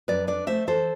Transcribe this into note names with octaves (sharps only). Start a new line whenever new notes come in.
F#2 B4 D5
D4 B4 D5
A3 C5 E5
E3 A4 C5